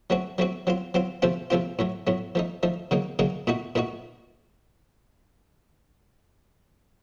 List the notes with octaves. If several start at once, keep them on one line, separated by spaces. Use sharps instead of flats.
F#3 A3 C4 F#4
F#3 A3 C4 F#4
F#3 C4 F4
F#3 C4 F4
C3 F3 A3 C4 F4
C3 F3 A3 C4 F4
A2 F#3 A3
A2 F#3 A3
F3 A3 D#4
F3 A3 D#4
C#3 F#3 A#3 D#4
C#3 F#3 A#3 D#4
A#2 A3 D#4 F#4
A#2 A3 D#4 F#4